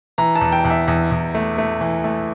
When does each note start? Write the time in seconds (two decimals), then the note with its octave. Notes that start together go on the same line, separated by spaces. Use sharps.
0.18 E3 A#5
0.35 A5
0.41 E2
0.52 G5
0.65 E2
0.70 E5
0.88 E2
1.11 E2
1.35 A3
1.58 A3
1.81 E3
2.04 A3